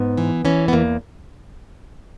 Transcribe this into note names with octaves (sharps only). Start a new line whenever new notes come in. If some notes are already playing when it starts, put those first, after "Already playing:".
Already playing: G#2 B3
E3
E3 C#4
B3
E2 A#3